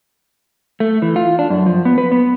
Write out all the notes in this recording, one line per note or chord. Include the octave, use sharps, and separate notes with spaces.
A3
E3
F4
D4
F#2
F3
B3
B4
B3